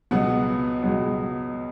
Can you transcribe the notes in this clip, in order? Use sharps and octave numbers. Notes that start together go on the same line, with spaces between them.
C#2 B2 F#3 B3 F#5
C#2 B2 F#3 B3